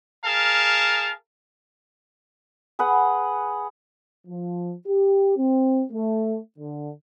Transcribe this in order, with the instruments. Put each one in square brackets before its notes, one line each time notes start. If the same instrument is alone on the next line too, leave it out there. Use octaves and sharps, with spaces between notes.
[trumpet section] G#4 A#4 F5 A5
[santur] G#4 B4 F#5
[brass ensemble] F3
G4
C4
A3
D3